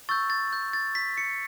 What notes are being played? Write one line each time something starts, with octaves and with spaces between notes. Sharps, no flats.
C#6 E6 G6 A6
A6
G6
A6
B6
C#7